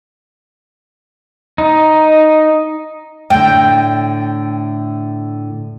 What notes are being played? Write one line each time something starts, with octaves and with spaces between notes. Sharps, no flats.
D#4
A2 D3 G5